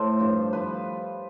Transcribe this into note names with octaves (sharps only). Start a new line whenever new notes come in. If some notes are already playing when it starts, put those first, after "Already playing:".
Already playing: A2 A4 C5
G2 F3
F3 B4